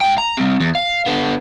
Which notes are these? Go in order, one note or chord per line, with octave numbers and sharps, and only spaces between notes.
G#2 G5
A#5
G3 C4
E2
F5
D3 B3